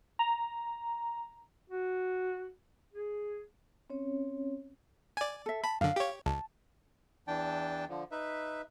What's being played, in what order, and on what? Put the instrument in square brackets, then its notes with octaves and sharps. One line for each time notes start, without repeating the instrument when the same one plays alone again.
[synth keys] A#5
[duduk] F#4
G#4
[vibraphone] C4 C#4 C#5
[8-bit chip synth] D5 G#5
[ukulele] A4 E5
[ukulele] A5 [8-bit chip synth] B5
[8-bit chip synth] F#2 D3 [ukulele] F5
[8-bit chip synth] G4 C#5
[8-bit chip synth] C#2 [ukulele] A5
[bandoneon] E2 E3 D4 G5 A5
D3 F3
D#4 B4 E5